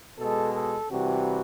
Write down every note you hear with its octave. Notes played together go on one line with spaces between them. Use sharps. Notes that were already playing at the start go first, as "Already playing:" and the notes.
B2 G#3 A4
A4
C3 E3 G3 F#4